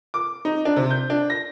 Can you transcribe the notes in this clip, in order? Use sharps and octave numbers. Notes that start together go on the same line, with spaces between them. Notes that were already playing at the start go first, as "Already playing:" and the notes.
D6
D#4
D4
C3
G6
D4
A#6